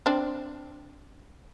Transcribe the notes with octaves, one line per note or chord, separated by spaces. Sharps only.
C4 D4